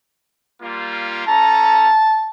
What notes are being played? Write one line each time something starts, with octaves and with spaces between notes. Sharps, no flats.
G3 A#3 F4
C#4 A4 A5 A#5